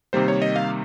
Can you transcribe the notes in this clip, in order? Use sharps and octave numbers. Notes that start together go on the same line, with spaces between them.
C3 D#3 G3 A#3 C5
C#5
D#5
F5